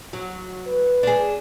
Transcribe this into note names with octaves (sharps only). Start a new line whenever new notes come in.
F#3
B4
D4 G#4